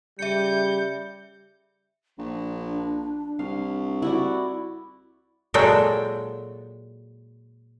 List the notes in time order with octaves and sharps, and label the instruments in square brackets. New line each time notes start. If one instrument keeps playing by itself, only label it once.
[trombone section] C#3 G3 [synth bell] E5 C#7 [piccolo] G6
[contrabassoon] A#1 [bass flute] D4
[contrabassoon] C2 [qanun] F5
[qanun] E4 F#4 D5
[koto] A#2 F#3 G#3 F#4 A4 G5